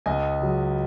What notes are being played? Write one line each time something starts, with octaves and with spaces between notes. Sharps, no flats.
C#2 D#5 G#5
C#3 F#3